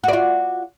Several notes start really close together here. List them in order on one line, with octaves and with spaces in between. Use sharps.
F#4 D5 F4